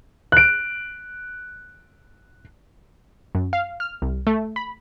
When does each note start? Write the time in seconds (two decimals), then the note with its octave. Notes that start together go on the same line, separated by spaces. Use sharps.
0.32 F#6 D7
3.35 F#2
3.53 F5
3.80 F6
4.02 C2
4.27 A3
4.56 B5